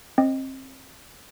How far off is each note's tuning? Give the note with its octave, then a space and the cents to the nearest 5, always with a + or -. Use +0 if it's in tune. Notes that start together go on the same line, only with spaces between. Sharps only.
C4 +30 D#5 +0